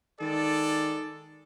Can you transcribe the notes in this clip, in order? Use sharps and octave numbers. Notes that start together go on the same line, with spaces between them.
D#3 G#3 A4 D5